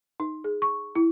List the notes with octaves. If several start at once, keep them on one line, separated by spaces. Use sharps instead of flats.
D#4
G#4
C#6
E4